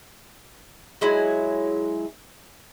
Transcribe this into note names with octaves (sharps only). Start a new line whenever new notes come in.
F#3 G#3 E4 G#5